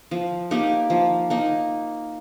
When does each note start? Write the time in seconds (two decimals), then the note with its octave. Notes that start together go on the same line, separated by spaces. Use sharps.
0.11 F3
0.51 A#3 D#4 G4
0.90 F3
1.30 A#3 D#4